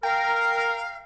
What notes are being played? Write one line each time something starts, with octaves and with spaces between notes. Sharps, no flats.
A#4 F5 G5